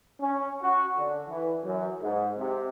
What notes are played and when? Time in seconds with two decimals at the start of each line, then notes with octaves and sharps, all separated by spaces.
0.21 C#4
0.62 F#4
0.98 D3
1.29 E3
1.64 F#2
2.01 G#2
2.39 C3